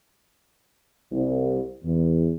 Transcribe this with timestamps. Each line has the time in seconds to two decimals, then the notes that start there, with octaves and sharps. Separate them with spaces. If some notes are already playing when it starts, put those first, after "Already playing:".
1.12 C2
1.84 E2